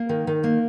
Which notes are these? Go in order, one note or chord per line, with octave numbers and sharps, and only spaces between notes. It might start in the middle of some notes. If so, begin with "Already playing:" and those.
Already playing: A#3
D#3
D#3
A#3